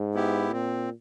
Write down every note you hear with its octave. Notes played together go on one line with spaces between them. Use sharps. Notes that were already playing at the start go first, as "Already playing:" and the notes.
Already playing: G#2
B3 E4 G4
A#2 C4